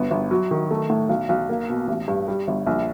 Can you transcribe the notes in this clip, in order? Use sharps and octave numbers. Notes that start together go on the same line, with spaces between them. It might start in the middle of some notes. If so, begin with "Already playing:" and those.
Already playing: G1 B3
G1
F#3
D#3
A3
A2
B1
B1
A#3
B2
A1
G2
G3
G1
A#1